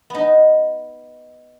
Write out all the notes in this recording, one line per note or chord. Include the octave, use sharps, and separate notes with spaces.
B3 D#4